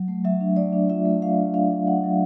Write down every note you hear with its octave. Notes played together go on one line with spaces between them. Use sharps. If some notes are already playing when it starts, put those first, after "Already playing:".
Already playing: F#3
A3
F#3 E5
D4
A3 D5
D4
F4 E5
A3
A3 F5
D4
D4 F5
F#3
F#3 F#5
F#3